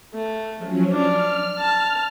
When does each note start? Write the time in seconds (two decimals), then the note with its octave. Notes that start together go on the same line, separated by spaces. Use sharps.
0.13 A3
0.57 F3 F#3 C#4
0.92 D4 F6
1.58 A5